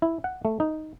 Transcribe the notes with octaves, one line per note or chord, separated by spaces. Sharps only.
E4
F#5
A3
D#4